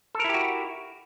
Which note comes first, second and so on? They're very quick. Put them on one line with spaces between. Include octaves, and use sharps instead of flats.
A4 A#4 E4 G4 F#4